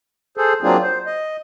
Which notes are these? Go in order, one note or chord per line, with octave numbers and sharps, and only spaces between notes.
G#4 A4 C5
F#3 A#3 C4 D4 F4 G#4
C5
D#5